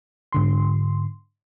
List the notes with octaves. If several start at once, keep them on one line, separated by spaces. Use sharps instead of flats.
G#2 D3 C6